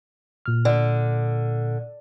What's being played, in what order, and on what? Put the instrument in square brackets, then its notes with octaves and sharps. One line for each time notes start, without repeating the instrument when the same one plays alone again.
[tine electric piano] A#2 F6
[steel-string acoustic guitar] D3